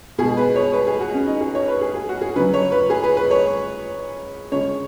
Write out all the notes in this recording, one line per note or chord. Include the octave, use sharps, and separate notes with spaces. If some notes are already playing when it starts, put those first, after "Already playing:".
B2 G#3 G#4
B4
C#5
B4
G#4
F#4
C#4
D#4
G#4
C#5
B4
G#4
G#4
F#4
G#4
C#3 F#3 B4
C#5
B4
G#4
B4
B4
C#5
C#3 G#3 C#5